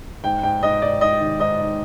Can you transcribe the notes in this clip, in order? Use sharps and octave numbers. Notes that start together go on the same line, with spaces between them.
G#2 G5
G#2 G5
G#2 D#5
G#2 D5
G#2 D#5
D#3
G#2 D#5
D#3